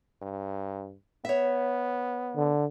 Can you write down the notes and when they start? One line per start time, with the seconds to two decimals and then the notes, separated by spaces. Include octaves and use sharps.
0.22 G2
1.25 B3 C#5 E5
2.36 D3